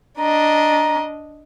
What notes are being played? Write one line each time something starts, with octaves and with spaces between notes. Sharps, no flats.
D4 D#5 A#5